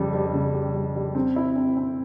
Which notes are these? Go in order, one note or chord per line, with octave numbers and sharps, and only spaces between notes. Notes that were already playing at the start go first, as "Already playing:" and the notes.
Already playing: F2 C#3 G3
G3
C#3
G3
G3
G3
C4
E4
C4
C4